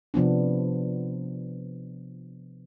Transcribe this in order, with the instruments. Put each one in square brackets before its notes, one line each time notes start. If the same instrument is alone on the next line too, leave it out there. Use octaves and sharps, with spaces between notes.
[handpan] C3 F3 B3 D4